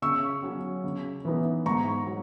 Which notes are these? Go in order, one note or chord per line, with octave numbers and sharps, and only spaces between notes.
C#3 C#6 E6
F#3 C#4
C#3
E3 B3 D#4
G#2 A#5 C#6
F#3